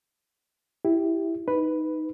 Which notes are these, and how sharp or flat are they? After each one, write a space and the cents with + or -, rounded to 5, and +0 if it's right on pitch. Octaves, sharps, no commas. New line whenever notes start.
E4 +0 G4 +0
D#4 +5 B4 +0